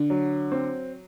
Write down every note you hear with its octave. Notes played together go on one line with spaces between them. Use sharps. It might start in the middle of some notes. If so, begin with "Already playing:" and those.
Already playing: D3
F#3
C4